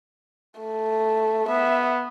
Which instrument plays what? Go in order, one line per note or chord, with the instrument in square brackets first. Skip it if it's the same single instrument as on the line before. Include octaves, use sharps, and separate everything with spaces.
[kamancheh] A3
[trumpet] B3 [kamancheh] E5